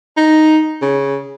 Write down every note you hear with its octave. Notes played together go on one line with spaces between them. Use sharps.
D#4
C#3